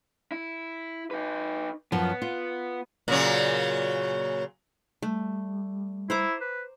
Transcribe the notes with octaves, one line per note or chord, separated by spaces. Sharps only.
E4
D#4 B4
F#2 F3 B3
F4
A#2 C#3 F#3
G3 A3
E4 C5 A#5 D6
B4